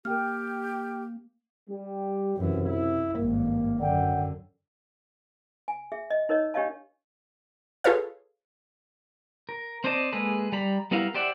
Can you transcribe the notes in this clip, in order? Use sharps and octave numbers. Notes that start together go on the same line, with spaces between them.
A#3 G4 A#4 G5 F6
G3 G4
B1 F#2 C3 E3
E4
G#1 G2 A#3
F#2 D3 D5 F#5 G5
G#5
G#4 E5
D#5
D#4 A#4 C#5 D#5
D4 G4 C#5 D#5 F5 A5
F4 G#4 A4 B4 C#5 F5
A#4
C4 C5 D5 D#5 A5
G#3 A#3 G#4 A4 B4
G3 D5 A#5 B5
G3 B3 E4 A#4 F5
G4 C5 D5 E5 F#5